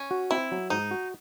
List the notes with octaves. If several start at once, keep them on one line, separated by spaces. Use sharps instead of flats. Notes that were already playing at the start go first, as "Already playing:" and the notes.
Already playing: C#4
F#4
C4 E4
F#3
G#2 D#4
F#4